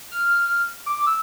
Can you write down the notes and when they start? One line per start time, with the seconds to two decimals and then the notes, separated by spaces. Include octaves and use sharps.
0.11 F6
0.86 D6
1.07 E6